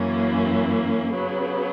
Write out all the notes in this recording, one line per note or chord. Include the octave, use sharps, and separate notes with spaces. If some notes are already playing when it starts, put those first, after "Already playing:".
Already playing: F#2 E3 A#3 C#4
C#3 F#3 B3